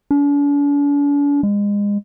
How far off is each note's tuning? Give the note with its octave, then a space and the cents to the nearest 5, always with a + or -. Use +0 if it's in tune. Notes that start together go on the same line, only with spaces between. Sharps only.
D4 -45
G#3 -30